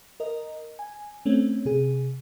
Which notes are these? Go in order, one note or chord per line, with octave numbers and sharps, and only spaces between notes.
A#4 D#5
G#5
A3 C4 C#4
C3 G#4